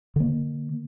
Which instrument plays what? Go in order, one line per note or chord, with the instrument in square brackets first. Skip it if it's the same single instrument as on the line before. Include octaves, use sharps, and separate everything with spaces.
[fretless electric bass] D3 A#3